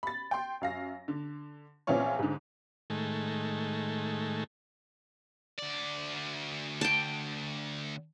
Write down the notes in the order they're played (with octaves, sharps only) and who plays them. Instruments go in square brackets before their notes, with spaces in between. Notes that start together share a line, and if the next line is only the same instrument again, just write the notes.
[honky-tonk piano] B5 A6
G5 C6
F#2 F5 A#6
D3
A#1 E3 C4 C#4 F4 C#5
G#2 D3
[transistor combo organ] A2 D#3 G#3 A3
[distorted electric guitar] D2 D5
[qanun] G5 A5